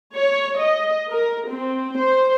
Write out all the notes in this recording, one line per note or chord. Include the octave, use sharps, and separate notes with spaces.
C#5
D#5
A#4
C4
C5